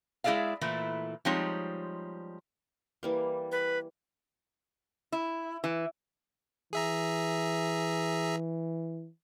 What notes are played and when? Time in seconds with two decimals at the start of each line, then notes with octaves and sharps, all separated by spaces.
0.24 G#3 E4 G#4 D5 E5 F5
0.61 A#2 E3 A3 E4
1.25 F3 G3 G#3 C4 D#4 C#5
3.03 E3 G3 A#3
3.52 B4
5.12 E4
5.64 E3
6.73 E3 G#4 E5 A#5